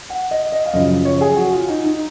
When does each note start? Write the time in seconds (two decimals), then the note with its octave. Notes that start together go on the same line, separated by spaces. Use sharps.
0.10 F#5
0.31 D#5
0.52 D#5
0.66 F5
0.73 F#2 C#3 F3 D#5
1.05 C#5
1.21 G#4
1.36 F#4
1.53 F4
1.68 D#4
1.84 D#4